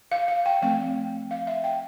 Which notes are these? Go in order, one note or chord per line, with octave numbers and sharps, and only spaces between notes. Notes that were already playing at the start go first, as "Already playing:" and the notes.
F5
F5
G5
F3 A3 C4 G5
F5
E5
G5